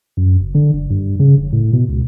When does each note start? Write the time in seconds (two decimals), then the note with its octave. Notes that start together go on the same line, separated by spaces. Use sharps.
0.17 F#2
0.40 F#1
0.55 D3
0.74 F#1
0.90 G2
1.20 C#3
1.38 F1
1.52 A2
1.73 B2
1.89 C#2